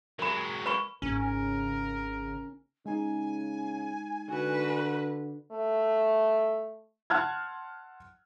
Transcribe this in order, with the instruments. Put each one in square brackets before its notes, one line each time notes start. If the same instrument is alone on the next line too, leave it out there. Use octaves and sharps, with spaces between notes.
[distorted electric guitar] F#3 G#3 [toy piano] A#4 B5
[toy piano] B4 B5 C#6
[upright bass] G#1 D#4 [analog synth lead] C#3 [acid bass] C#4 [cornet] A#4
[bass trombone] C#3 [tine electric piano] G#3 D#4 [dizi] G#5
[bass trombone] D3 [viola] F#4 B4
[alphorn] A3
[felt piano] F#5 A5 C6 F6 F#6 G#6